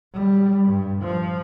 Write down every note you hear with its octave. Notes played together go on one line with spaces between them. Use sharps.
G3
G2
F3